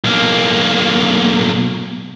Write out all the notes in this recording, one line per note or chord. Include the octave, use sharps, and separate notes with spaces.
B1 A#3